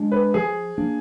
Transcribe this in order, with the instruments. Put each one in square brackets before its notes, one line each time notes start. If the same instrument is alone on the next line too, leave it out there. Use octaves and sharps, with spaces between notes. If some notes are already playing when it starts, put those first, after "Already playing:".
Already playing: [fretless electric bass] G#3 D4
[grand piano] B4
[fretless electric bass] F3 [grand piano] G#4
[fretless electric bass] A#3 D4